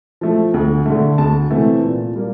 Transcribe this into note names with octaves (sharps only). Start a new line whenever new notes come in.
F3 A3
D2
D3 A3
D2 A5
C3 E3 A3
A#2
G3 A#3